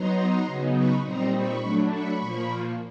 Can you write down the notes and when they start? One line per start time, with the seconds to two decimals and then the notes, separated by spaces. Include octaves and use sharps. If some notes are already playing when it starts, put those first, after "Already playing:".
Already playing: F#3 B3 D#4 A#5 C6
0.46 C#3 F#3 B3 D#4
0.74 B5 C#6
1.04 A#2 G3 C4 D#4 A#5 C6
1.33 B5 C#6
1.61 F#3 A3 D4
1.91 B5 C#6
2.20 A#2 F3 A#3